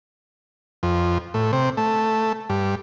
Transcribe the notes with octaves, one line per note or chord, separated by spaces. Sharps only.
F2
A2
C3
A3
G2